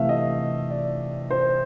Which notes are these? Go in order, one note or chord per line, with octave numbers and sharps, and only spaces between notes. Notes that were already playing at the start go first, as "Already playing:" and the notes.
Already playing: C3 E3 A3 E5 F5
D#5
D5
C5